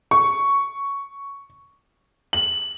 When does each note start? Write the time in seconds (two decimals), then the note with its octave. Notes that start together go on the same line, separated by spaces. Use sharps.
0.11 C#6
2.33 F#7